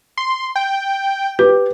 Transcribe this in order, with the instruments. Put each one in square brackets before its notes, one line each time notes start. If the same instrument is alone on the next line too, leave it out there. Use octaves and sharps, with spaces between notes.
[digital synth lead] C6
G5
[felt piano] G4 [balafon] B4